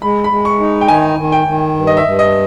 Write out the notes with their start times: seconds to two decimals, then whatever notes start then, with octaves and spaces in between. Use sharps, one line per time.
0.02 G#3 B5
0.24 B5
0.31 G#3
0.45 C#6
0.60 D#4
0.81 G5
0.88 D#3 G#5
1.18 D#3
1.32 G5
1.47 D#3
1.76 G2
1.87 D#5
1.97 E5
2.04 G2
2.19 D#5